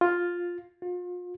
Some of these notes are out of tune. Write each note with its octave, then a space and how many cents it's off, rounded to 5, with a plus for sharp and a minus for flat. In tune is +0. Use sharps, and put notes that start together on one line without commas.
F4 +5
F4 +35